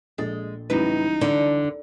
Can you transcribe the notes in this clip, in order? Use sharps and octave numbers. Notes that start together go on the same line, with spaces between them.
A#1 G#3 A4 A6
C#2 A2 E3 F#3 G3 D#4 B4
D3 D4